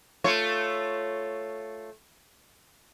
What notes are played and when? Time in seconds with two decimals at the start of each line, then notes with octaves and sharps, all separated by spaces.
0.24 A3 F4 C#5